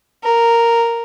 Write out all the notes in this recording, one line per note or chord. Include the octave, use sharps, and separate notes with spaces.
A#4